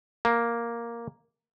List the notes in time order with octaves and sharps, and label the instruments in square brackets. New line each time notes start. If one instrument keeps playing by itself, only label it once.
[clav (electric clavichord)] A#3